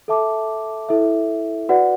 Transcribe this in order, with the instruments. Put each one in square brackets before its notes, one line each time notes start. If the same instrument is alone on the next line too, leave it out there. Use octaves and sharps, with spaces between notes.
[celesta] A4 E5 A5 D6
E4 A4 E5
F#4 B4 D5 F#5